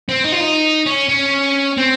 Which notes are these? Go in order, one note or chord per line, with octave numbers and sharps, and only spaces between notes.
C4
D#4
F4
D#4
C#4
C#4
C4